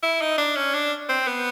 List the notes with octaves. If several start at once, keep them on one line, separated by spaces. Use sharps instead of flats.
E4
D#4
D4
C#4
D4
C4
B3